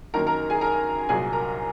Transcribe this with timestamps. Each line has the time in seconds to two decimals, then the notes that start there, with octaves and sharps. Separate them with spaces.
0.14 F#2 D#3 A#3 A#4 A#5
0.27 A#4 A#5
0.50 G#4 G#5
0.61 A#4 A#5
1.09 C2 A#2 F#3 G#4 G#5
1.33 A#4 A#5